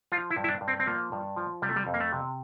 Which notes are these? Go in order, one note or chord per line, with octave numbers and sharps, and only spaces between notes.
F3 F4
E4
G2
E4
D4
G2
C4
C4
F3 A#3
G2
F3
C3 G3
A3
G3
F2
A#3
A3
C3